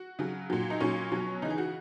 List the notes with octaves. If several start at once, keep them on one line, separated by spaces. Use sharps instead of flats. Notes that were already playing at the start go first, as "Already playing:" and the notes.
Already playing: F#4
C#3 F#3
A#2 F#3
D#4
A#2 F#3 C#4
B2 F#3
C#3 E3 D#4
G#4
F#4